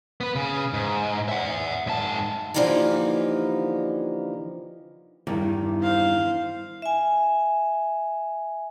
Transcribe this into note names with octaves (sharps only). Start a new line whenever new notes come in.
B3 B4
C#3
G#2
E5 F#5
G#2 A5
D3 E3 F3 A#3 D#4 G4
E2 G2 D#3
C5 F5
E5 G#5